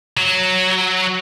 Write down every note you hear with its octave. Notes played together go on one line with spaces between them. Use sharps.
F#3